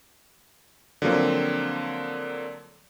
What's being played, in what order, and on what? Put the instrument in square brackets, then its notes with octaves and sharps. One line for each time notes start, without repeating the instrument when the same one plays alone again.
[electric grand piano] D3 F3 F#3 A#3 C4